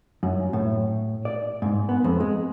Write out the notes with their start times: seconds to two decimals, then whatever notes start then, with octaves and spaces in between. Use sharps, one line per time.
0.23 F#2
0.53 A2
1.25 D5
1.62 G#2
1.89 B3
2.04 F2
2.20 G#3